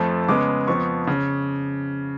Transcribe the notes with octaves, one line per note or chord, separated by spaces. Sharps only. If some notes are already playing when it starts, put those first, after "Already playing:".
Already playing: F2 F3 A3
C#3 G#3 B3 D6
F2 F3 B3 C#6
C#3